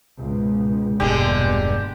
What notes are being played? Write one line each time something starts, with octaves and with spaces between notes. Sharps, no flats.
C#2 G#2 B2
E1 G2 A#2 D3 G3 G#3 B3 G4